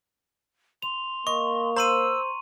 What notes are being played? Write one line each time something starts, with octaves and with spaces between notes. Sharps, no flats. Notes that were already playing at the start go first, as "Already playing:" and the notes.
C6 F7
A#3 D#5 C#6
C5 A#5 C6 E6 D#7